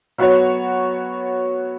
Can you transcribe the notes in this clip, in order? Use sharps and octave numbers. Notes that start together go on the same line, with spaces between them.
F#3 B3 F#4 C#5